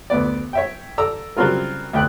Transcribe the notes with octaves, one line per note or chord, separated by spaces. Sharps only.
D2 B3 D5
C#5 E5 G5
A4 D5 A#5 E6
C#3 F#3 G3 C4 F4 A#4
D2 G5 F#6